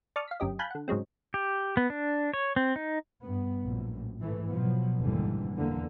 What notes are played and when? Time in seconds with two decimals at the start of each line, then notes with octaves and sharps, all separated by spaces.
0.16 D5 A5 C#6 D#6 F6
0.28 F5 B6
0.40 G1 F#2 G4 D#5
0.59 F5 G#5 A5 B5 F#6 G6
0.70 D3 F#5
0.88 G#2 C#3 F#3 G#3 C4
1.34 G4
1.77 B3
1.90 D4
2.34 C#5
2.56 C4
2.76 D#4
3.22 G2 B3
3.64 A#1 F#2 A2
4.19 G#2 E3 A3
4.50 B2 F3 F#3 B3
4.98 F#1 D#2 G#2 D3 E3 G3
5.55 E2 D3 A#3